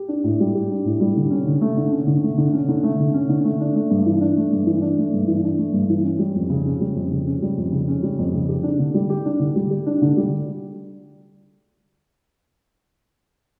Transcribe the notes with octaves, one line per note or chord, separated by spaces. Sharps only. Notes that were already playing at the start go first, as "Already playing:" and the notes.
Already playing: G4
D4
A2
G3
G4
D4
A2
G3
D3
C#4
D3
A3
D3
C#4
D3
A3
D3
C#4
D3
A3
D3
C#4
D3
A3
D4
A3
G2
E3
D4
A3
G2
E3
D4
A3
G2
E3
D4
A3
G2
E3
C#4
G3
F2
C#3
C#4
G3
F2
C#3
C#4
G3
F2
C#3
C#4
G3
F2
C#3
G4
D4
D3
G3
G4
D4
D3
G3
G4
D4
D3
G3